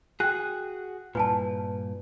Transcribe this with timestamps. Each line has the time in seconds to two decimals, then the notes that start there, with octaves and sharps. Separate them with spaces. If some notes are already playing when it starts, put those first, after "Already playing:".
0.20 F#4 G#4 G5 F#6
1.15 G2 A#2 E4 B4 G#5 A5